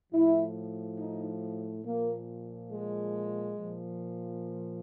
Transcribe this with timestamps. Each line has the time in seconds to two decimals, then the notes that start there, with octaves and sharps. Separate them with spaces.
0.13 A2 F3 E4
0.99 D#4
1.85 A#2 F3 A#3
2.71 G#3
3.57 A#2 F3